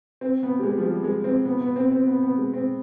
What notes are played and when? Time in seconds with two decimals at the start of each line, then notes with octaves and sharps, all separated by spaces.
0.21 C4
0.43 B3
0.59 G3
0.63 G#3
0.78 F3
0.83 G3
1.04 G#3
1.24 C4
1.45 B3
1.61 B3
1.76 C4
1.92 C4
2.07 B3
2.23 B3
2.38 G#3
2.54 C4